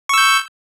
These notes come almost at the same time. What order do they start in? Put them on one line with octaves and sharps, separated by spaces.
C#6 E6 G6